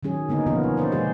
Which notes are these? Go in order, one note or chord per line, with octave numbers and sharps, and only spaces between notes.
D#3 F#3 C#4 G#4
D3 A#3 B3 D#4
B2 F3 B3 C#4 F4 A#4
C#5
C#4 F4 C5 D5
B2 G#3 G4 G#4 C5